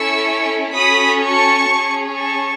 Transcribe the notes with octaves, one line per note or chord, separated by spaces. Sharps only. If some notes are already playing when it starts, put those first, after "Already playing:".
Already playing: C#4 E4 A4 C#6 E6
C#4 F#4 A4 B5 D#6
A5 C#6
C#4 G#4
A5 C#6